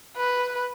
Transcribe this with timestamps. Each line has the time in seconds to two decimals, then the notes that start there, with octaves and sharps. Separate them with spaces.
0.17 B4